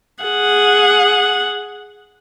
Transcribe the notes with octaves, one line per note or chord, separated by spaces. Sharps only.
G#4 F#5